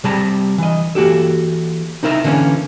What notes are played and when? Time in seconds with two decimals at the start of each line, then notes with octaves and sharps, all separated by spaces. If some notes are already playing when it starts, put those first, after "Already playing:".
0.04 C3 G3 A5 A#5
0.58 E3 D#5
0.95 E3 A#3 F#4 G4 A4
2.03 D#4 E4 A#4 E5 A#5
2.24 D3 E3 A#3 C4 C#4